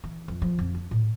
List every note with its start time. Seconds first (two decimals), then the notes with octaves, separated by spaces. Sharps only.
0.04 E3
0.28 F2
0.42 F3
0.59 F2
0.75 D4
0.91 A2